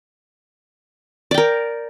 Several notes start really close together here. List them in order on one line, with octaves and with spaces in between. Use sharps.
D5 G5 A#4